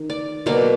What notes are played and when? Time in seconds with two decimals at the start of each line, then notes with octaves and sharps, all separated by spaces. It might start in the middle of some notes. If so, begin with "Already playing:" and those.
Already playing: D#3
0.10 D5
0.46 B2 F#3 A#3 D5